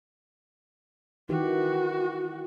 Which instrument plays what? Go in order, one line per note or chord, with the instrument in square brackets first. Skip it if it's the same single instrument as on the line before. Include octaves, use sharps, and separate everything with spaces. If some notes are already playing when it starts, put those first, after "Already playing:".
[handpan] D#3 E3 G4 [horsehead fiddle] F#4